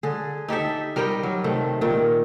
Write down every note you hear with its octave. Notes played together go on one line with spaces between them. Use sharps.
D3 G#4
D#4 G4 A4 E5
G3 A#4 D#5 G5
F#3
C3 D#3 A3
A#2 D#3